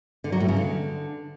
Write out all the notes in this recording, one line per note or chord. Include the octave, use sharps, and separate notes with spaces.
D3
F#3
A2
C#3
D3